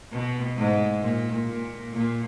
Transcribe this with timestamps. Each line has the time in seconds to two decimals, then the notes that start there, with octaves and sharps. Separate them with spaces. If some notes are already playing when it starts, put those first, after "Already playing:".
0.12 B2
0.57 G#2
1.02 A#2
1.47 A#2
1.93 A#2